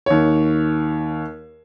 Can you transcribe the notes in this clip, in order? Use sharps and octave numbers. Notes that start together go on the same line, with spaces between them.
D#2 C#5